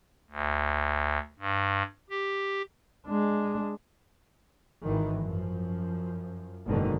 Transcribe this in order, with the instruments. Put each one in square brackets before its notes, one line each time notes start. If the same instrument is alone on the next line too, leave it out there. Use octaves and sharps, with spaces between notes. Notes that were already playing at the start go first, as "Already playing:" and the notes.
[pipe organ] D2
G2
G4
[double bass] G#3 D4
[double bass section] G#1 D#3 E3
F#2 F3
F#1 G#2 B2 D3 D#3